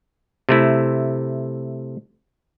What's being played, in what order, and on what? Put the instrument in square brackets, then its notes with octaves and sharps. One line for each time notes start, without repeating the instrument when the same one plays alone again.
[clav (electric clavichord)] C3 A3 E4